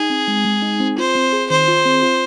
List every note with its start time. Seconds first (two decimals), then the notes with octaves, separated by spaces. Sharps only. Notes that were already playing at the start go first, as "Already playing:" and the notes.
Already playing: D#4 G#4
0.10 C4
0.28 G#3
0.45 G#3
0.62 D#4
0.80 C4
0.98 F4 C5
1.15 C4
1.33 G#4
1.50 D#3 C5
1.68 F4
1.85 C4
2.02 F4